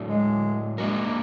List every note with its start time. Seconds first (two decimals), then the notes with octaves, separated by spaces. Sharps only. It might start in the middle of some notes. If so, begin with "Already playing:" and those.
Already playing: A2 F#3 A3 D4
0.08 G#3
0.78 G#3 A#3 D4 F#4 A#4